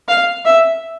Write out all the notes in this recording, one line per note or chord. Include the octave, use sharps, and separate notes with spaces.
F5
E5